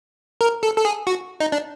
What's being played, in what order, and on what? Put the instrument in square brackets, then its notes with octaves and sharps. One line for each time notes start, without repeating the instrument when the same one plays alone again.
[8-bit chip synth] A#4
A4
A4
G#4
F#4
D#4
D4